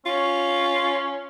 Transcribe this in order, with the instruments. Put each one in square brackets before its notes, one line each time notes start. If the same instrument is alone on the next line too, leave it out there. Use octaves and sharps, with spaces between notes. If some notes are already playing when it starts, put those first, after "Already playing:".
[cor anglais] C#4 [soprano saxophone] F4